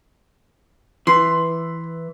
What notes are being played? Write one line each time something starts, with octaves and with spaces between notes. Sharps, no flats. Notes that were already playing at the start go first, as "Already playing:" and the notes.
E3 C6